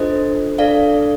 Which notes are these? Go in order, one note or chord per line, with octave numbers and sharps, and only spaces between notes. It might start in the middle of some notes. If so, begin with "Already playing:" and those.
Already playing: D4 F4 A4 C5 D#5
D4 A4 D5 F5